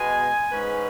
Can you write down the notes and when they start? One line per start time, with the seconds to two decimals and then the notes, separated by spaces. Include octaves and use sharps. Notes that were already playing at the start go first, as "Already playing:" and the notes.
Already playing: B2 G#3 B3 G#5
0.52 G#2 G#3 C#4 B4